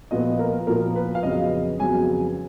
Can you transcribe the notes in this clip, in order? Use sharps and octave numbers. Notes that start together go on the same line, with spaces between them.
A#2 F3 B3 D#5
A#4
A#2 F3 B3 A#4
B4
F5
F2 C#3 F#3 B3 D#5
F2 C#3 F#3 B3 G#5